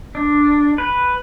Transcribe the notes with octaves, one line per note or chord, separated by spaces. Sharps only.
D4
B4